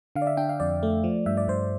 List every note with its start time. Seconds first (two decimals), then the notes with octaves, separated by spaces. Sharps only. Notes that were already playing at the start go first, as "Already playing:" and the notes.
0.16 D3 F5
0.22 D5
0.27 E5
0.37 D4 G5
0.49 F5
0.60 F2 D5
0.83 A3
1.04 F3
1.26 G2 E5
1.37 D5
1.48 G2 C5